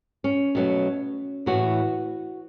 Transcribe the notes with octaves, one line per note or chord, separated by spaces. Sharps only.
C#4
B2 F#3 A3
A2 E3 A3 F#4